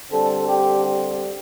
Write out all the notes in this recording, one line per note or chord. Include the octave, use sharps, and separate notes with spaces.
D3 G3 C4 A4
G4